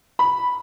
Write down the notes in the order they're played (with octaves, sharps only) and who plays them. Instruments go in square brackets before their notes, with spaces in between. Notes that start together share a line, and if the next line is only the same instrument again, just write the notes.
[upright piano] B5